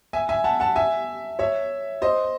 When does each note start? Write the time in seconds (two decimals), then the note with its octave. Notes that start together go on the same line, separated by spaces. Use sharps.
0.13 E5 G#5
0.29 E5 G#5
0.44 F#5 A5
0.60 F#5 A5
0.76 E5 G#5
1.39 C#5 E5
2.02 C5 D#5